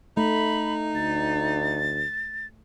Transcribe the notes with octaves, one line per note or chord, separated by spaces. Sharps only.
A3 D#4 B5
D2 A6